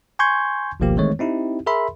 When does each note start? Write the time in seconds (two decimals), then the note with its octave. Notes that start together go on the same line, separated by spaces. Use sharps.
0.19 G#5 C6 C#6 G6 G#6
0.80 G1 C#2 B2 F3 A#3 G4
0.97 D#3 E3 G#3 A3 C4 C#5
1.19 C4 D#4 E4 G4
1.66 G#4 A#4 E5 B5 C6